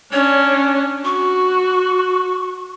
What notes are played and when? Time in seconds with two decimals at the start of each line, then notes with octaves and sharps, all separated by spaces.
0.12 C#4 D4 C#5
1.05 F#4 C#6